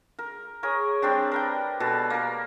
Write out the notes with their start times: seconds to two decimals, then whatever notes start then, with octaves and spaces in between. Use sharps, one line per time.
0.19 A#4
0.63 G#4 A#4 C#5
1.02 G3 C4 D4 G4
1.32 A#4 B4 G5
1.80 B2 A4 B4
2.10 A#3 A#4